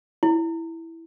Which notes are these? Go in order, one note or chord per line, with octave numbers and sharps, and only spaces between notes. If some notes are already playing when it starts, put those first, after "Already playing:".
E4